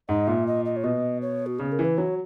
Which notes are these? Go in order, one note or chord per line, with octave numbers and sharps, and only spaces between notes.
G#2 D#5
A#2 E5
D#5
D#5
C#5
B2 D#5
C#5
F#4
C#3 G#4
A#4
E3
B4
F#3 C#5